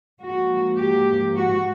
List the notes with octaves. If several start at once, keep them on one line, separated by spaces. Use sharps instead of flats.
G#2 F3 A#3 F#4
G4
F#4